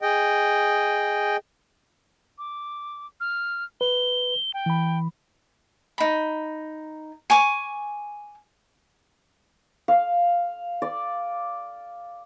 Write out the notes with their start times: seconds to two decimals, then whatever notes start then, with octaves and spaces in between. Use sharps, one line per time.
0.02 G#4 D#5 G5
2.38 D6
3.20 F6
3.81 B4 G7
4.54 G5
4.66 E3 B5
5.98 D#4 B5
7.30 G#5 C#6 D6
9.88 F5
10.82 D5